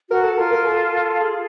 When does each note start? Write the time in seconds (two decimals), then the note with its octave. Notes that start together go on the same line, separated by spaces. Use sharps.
0.10 F#4 A#4
0.24 A4
0.38 F4 A#4
0.52 A#4
0.65 A4
1.21 G#4